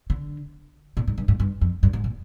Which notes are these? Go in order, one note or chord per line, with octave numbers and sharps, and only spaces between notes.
D3
A#2
G#2
G2
G#2
G2
F2
G2
G#2
A#2